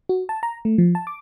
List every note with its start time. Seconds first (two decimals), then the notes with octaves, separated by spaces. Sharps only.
0.09 F#4
0.29 A5
0.43 A#5
0.65 A3
0.78 F3
0.95 A5
1.07 D6